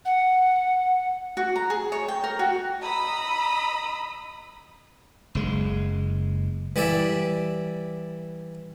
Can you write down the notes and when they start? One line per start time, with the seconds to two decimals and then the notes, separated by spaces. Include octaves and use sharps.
0.05 F#5
1.37 F#4
1.56 A#5
1.70 G#4
1.92 C#5
2.08 G5
2.24 A#4
2.39 F#4
2.80 D#5 A#5 B5 D#6 E6
5.35 F#1 G#3
6.76 E3 G3 D5 E5